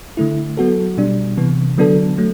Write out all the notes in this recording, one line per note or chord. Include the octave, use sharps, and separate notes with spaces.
D3 A3 E4
F#3 B3 F#4 A4
B2 G3 D4
C3 E3 B3
D3 F#3 B3 D4 A4
F#3 A3